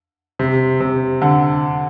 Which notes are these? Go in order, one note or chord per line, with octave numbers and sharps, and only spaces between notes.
C3
C3
D3